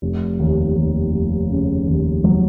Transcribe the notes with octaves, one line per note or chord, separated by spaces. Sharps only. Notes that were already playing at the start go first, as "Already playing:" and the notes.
F1
D#2
D#2
F1
C#3
D#2
F#3